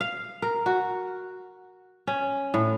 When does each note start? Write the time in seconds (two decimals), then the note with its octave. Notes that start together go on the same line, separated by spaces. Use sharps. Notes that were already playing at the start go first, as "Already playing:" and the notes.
0.01 F5
0.42 A#4
0.66 F#4
2.07 C#4
2.54 A2